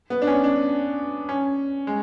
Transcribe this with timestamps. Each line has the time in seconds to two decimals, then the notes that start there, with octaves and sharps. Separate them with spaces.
0.10 B3
0.22 D4
0.27 C#4
0.44 D4
1.29 C#4
1.87 G#3